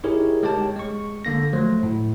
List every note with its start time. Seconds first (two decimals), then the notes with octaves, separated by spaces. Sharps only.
0.04 D#4 E4 G4 G#4 A#4 C#5
0.43 G#3 G4 C#5 G5 A5
0.76 G#3 C#6
1.25 D3 A#3 A#6
1.53 F3 F#3 A3 C5
1.83 A2